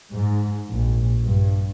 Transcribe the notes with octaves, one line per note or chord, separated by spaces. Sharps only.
G#2
A#1
G2